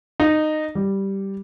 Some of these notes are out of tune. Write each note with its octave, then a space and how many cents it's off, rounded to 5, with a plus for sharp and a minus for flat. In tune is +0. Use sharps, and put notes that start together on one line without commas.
D#4 -15
G3 -5